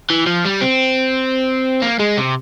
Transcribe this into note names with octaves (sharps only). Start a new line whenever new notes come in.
E3
F3
G3
C4
A#3
G#3
C3